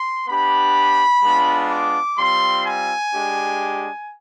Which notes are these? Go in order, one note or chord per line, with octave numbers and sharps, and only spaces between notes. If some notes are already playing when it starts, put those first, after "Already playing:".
Already playing: C6
B3 D4 G4 B5
G#3 B3 D4 F4
D6
G3 C4 F4 C6
G#5
G#3 D4 G4